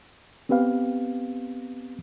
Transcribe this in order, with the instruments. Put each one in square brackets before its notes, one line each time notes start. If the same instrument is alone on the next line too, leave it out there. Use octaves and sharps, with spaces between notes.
[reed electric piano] B3 C4 G4 B4 F5